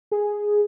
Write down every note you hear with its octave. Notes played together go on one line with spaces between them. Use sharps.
G#4